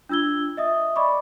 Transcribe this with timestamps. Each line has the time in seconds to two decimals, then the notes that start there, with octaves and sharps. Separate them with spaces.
0.09 D4 F4 E6 G#6 G7
0.57 D#5 E5 D#6
0.96 D5 D#5 B5 C#6 D6